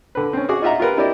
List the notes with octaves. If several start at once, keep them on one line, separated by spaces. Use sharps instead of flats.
D3 B4
C4 C#4
F#4 G#4 G#5 C#6 D6
D#4 F4 D#5 E5 F#5 A#5
F4 G4 A#4 B4
C4 E4 G4 A#4 D5 D#5